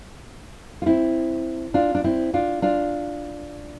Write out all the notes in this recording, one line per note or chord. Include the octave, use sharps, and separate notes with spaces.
F4
C4 E4
D4 F4
D4
C4 E4
D4 F4
D4 F4